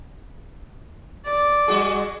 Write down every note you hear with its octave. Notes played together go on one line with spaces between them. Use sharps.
D5
G3 F#4 G#4